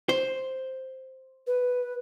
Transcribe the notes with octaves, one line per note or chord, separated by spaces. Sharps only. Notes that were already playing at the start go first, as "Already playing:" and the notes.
C5
B4